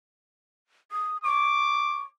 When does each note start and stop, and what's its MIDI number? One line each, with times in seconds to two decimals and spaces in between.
0.92 1.17 87
1.24 2.03 85
1.24 2.07 86